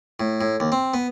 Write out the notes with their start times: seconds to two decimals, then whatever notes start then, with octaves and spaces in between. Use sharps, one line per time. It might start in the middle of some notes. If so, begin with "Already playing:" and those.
0.20 A2
0.41 A2
0.60 D#2
0.72 C4
0.94 B3